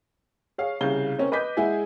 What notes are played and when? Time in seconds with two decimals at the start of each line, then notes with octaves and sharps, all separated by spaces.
0.58 G#4 C#5 F5
0.81 C2 C#3 F5 G6 G7
1.18 C4 C#4 A#4
1.32 B4 D#5 D6 G6 B6
1.57 G#3 E4 G#4 F#5 G#5